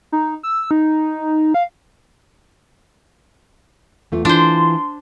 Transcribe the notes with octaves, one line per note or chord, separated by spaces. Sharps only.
D#4
E6
D#4
F5
E2 A3 F4
E3 D4 F4 C5 C6